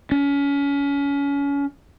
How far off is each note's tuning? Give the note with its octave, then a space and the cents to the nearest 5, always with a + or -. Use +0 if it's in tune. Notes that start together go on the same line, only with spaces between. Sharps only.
C#4 +30